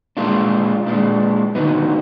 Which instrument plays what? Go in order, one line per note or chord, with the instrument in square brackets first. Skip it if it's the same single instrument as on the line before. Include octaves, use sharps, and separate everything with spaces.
[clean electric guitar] A#2 G#3 D4 F4
A#2 G#3 D4
D#2 D3 F#3 B3 D#4